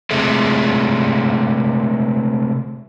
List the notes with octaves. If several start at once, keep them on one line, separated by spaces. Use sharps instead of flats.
C3 G#3 A3